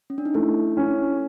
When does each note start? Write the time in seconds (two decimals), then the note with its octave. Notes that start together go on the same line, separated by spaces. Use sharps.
0.10 C#4
0.18 D4
0.25 D#4
0.34 A3 E4
0.77 C#4